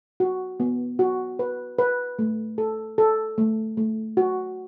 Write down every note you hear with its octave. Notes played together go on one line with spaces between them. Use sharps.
F#4
B3
F#4
B4
B4
A3
A4
A4
A3
A3
F#4